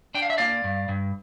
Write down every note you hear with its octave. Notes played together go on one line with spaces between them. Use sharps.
D4 G5
F5
E5
A#3 D5 F5
G2
G2